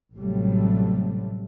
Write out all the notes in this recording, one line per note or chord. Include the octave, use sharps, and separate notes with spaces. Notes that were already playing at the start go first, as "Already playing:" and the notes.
A1 A2 C3 F#3 G3 A3